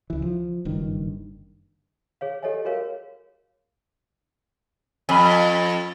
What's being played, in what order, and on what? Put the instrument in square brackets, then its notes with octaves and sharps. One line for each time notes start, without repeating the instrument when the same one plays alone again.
[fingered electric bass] C#2 E3
F3
F#1 G2 D#3
[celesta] G#4 C#5 F5
G4 A4 C#5 D#5 E5 G#5
F#4 G#4 A#4 C#5 F5
[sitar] F2 [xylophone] G#5 B5